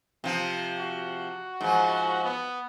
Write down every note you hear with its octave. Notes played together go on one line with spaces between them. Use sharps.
C3 F3
F#4
G#2 F3
B3